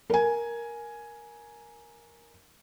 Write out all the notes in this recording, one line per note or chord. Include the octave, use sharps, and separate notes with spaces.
A#4 G#5